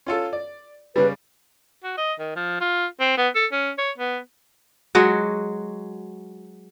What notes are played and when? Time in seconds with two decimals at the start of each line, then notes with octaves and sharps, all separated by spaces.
0.06 C#4 F4 A4
0.33 D5
0.96 C#3 G3 B4
1.84 F#4
1.98 D#5
2.19 D#3
2.36 F3
2.61 F4
3.00 C4
3.17 B3
3.35 A4
3.52 C#4
3.78 C#5
3.98 B3
4.95 F#3 G#3 F#4